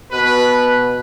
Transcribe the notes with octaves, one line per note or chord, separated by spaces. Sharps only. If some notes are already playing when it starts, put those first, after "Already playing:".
B2 B4